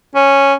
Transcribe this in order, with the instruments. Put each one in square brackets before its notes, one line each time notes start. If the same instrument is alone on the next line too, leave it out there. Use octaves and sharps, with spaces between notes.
[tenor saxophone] C#4